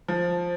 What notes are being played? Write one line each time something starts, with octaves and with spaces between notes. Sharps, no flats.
F3